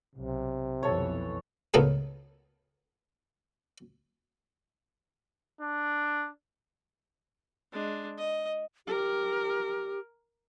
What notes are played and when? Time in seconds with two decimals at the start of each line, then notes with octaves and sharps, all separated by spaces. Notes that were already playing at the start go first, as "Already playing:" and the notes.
0.15 B1 C3
0.83 B1 F2 E3 A4 C#5
1.74 C#2 A2 C#3 B3 A4 A#4
5.61 D4
7.73 G#3 D4
8.18 D#5
8.87 G4 A#4